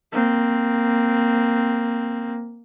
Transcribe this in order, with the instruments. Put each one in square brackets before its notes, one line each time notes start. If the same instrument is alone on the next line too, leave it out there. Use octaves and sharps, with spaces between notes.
[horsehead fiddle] A#3 C4